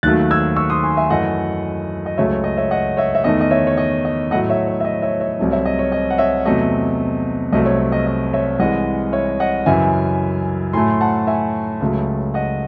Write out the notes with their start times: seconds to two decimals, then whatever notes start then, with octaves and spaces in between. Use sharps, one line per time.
0.03 D#2 D#3 F#3 A3 F#6 A6
0.31 E6 G#6
0.56 C#6 E6
0.70 C6 D#6
0.83 G#5 C6
0.97 E5 G#5
1.10 F#2 E3 A3 D#5 F#5
2.06 D#5
2.17 C#2 C#3 F#3 A3 C#5 E5
2.31 C#5
2.44 D#5
2.57 C#5 E5
2.71 D#5 F#5
2.97 C#5 E5
3.15 E5
3.24 E2 D#3 A3 D#5
3.41 D#5
3.51 C#5 E5
3.67 C#5
3.77 D#5
4.05 D#5
4.31 A2 F#3 A3 D#5 F#5
4.49 C#5 E5
4.67 C#5
4.80 E5
4.85 D#5
5.02 C#5 E5
5.20 C#5 E5
5.39 C2 C3 F#3 A3
5.52 C#5 E5
5.66 D#5
5.79 C#5
5.92 D#5
6.10 F#5
6.18 C#5 E5
6.46 E2 C3 F#3 A3 D#5
7.52 C2 C3 F#3 A3 D#5
7.66 C#5
7.80 C#5
7.92 D#5
8.06 D#5
8.33 C#5 E5
8.59 C2 C3 E3 G#3 D#5 F#5
9.13 C#5 E5
9.40 D#5 F#5
9.66 F#2 C#3 E3 E5 G#5
10.73 A2 F#3 A3 G#5 C6
10.89 C6
11.01 F#5 A5
11.27 E5 G#5
11.80 C#2 C#3 F#3 A3
12.34 D#5 F#5